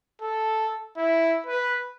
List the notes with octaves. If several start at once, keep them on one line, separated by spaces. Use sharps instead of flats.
A4
E4
B4